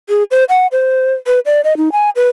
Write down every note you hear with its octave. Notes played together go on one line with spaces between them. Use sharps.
G#4
C5
F#5
C5
B4
D5
D#5
D#4
G#5
B4